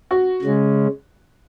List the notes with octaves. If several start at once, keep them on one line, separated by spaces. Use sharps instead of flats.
F#4
C#3 G#3 C#4